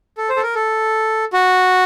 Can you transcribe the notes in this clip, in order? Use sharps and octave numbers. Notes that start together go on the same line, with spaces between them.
A4
C5
A4
A#4
A4
F#4